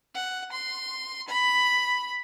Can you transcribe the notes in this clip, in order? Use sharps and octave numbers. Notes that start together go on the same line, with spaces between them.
F#5
C6
B5